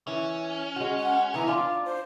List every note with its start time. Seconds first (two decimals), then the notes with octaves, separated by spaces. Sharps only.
0.07 E3 C#4
0.76 G#3 F#4
0.99 F#5
1.34 E3 B3 A#5
1.48 D4 F4 D6
1.85 C5